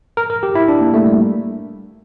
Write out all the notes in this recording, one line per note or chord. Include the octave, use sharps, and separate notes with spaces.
A#4
A#4
G4
E4
D4
A#3
A3
G3